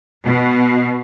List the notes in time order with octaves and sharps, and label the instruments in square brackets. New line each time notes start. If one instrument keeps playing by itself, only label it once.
[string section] B2